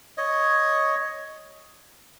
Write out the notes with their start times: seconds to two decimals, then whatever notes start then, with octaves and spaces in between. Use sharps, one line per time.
0.17 C#5 D#5